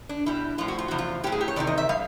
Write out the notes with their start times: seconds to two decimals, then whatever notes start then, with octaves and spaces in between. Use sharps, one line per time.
0.09 D4
0.26 B2 G3 E4
0.58 A2 F3 F4
0.68 F#4
0.79 F4
0.88 E2 C3 F3 F#4
0.98 F4
1.24 A2 F#3 G4
1.32 G#4
1.41 G4
1.48 C#5
1.56 E2 C3 D#3 D5
1.67 D#5
1.78 E5
1.89 G3 F5